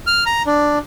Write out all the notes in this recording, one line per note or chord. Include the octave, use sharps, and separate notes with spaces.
F6
A#5
D4